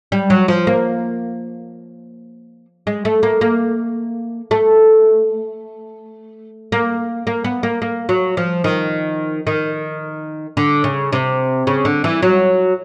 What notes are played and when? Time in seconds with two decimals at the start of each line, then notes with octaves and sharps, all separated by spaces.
0.12 G3
0.30 F#3
0.48 F3
0.67 A#3
2.87 G#3
3.05 A3
3.23 A#3
3.41 A#3
4.51 A3
6.72 A#3
7.27 A#3
7.44 B3
7.63 A#3
7.82 A#3
8.09 F#3
8.37 F3
8.64 D#3
9.47 D#3
10.57 D3
10.84 C#3
11.12 C3
11.67 C#3
11.85 D3
12.04 E3
12.22 F#3